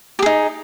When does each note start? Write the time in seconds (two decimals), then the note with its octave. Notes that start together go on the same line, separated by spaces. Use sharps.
0.19 G4
0.22 G#4
0.26 D#4